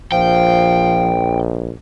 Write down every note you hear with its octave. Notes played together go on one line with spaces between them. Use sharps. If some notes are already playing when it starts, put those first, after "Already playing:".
A#1 F3 G5